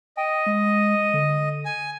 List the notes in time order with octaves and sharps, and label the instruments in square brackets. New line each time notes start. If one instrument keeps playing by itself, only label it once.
[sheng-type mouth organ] D#5 [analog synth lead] G5
[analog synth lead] G#3
D3
[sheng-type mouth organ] G#5